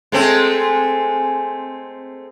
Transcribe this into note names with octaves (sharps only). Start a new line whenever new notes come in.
G#3 A3 C4